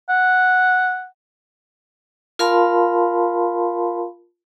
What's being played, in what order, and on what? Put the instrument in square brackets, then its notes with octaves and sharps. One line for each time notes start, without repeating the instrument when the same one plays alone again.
[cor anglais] F#5
[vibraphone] F4 A#4 F5 A5 B5 C6